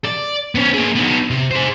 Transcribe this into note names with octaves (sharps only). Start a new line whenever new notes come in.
D5
B3 C#4
A#3 G#4
B3 D#4
C3
G#4 C5